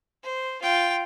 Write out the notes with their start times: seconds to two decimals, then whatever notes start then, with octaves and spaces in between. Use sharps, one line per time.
0.23 C5
0.62 F4 G5